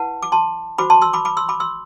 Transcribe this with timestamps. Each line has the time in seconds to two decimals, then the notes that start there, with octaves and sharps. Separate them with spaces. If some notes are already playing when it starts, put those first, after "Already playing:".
Already playing: E4 B4 F#5 A5
0.23 D6
0.32 A5 C6
0.78 F#4 C5 B5 D6
0.90 A5 C6
1.01 C6 E6
1.13 B5 D6
1.25 B5 D6
1.37 C6 E6
1.49 B5 D6
1.60 C6 E6